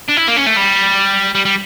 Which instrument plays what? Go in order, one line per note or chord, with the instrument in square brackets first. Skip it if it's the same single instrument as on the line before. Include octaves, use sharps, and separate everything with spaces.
[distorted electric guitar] D4
E4
A#3
C#4
A3
G3
G3
G3